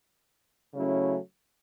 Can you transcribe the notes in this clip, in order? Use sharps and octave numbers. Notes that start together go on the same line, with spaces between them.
C#3 F#3 A3 C#4 E4